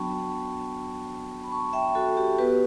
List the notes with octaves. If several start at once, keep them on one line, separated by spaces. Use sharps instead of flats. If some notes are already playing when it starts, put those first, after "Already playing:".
Already playing: F#3 B3 D4 F#4 G5 A5 B5 C#6
B5
A5 C#6
E5 G5
F#4 A4
G4
B3 F#4 G4 B4